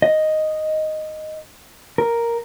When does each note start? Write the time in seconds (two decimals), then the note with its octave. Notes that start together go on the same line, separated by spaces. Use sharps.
0.02 D#5
1.98 A#4